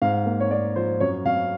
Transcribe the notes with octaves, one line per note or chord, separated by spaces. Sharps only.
G#2 F5
A#3
C#5
A#3 D5
F3 C5
F#2 C#5
F#2 F5